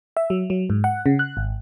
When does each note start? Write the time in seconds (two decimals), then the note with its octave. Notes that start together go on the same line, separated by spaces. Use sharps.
0.17 E5
0.30 F#3
0.50 F#3
0.70 G#2
0.84 F#5
1.06 C#3
1.19 F#6
1.37 G#1